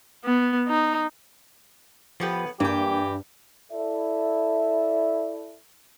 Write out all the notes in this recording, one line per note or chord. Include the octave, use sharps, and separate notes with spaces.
B3
D#4
A2 F3 B3 G4 B4
G2 E3 A#3 G4 G5
E4 A4 D5 E5